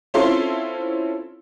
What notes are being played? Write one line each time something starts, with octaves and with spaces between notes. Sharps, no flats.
C4 C#4 E4 F4 A4 C6